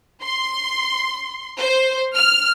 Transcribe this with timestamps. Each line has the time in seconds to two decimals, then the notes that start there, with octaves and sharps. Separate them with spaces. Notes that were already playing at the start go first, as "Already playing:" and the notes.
0.24 C6
1.60 C5
2.16 F6